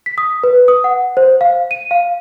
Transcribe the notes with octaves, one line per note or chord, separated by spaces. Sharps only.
B6
D#6
B4
D#6
F#5
C5
F5
D#7
F5